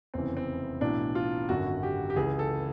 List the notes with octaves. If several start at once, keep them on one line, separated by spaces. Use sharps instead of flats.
F1 E2 C#3 E3 C4
C4
B1 A2 E3 D4
F4
G#1 F#2 D3 F#4
G4
G4
C#2 C#3 E3 G#4
A4